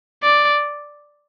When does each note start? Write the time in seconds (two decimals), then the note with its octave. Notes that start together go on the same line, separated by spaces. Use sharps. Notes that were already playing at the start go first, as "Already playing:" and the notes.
0.23 D5